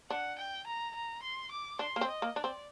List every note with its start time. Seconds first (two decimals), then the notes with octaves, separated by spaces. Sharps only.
0.10 D4 F#5
0.38 G5
0.66 A#5
0.95 A#5
1.22 C6
1.51 D6
1.79 D4 C6
1.96 A#3
2.01 C4
2.08 D#5
2.22 A#3
2.36 D4 D5
2.44 C4